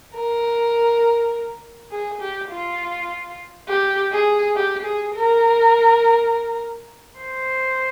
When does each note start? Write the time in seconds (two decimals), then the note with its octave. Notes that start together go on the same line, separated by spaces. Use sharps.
0.16 A#4
1.91 G#4
2.21 G4
2.51 F4
3.69 G4
4.12 G#4
4.56 G4
4.85 G#4
5.15 A#4
7.20 C5